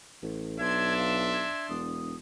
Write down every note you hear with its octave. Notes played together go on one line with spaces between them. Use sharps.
A1
B1 D4 E5 C6 G#6
F5
G#6
E1 D#6